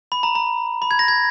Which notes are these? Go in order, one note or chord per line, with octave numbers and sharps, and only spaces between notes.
B5
A#5
A#5
B5
G#6
A#6
G#6